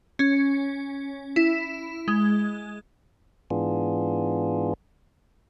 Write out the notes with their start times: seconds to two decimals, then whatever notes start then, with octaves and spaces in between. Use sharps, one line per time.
0.19 C#4
1.36 E4
2.08 G#3
3.50 G#2 E3 B3 D4 F4 G#4